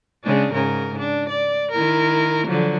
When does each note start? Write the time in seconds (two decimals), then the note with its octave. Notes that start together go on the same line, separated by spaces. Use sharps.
0.24 C#3 G#3 D4
0.52 G#2 C#3 A#4
0.99 D4
1.29 D5
1.72 D#3 E4 A#4
2.47 D3 F3 F#3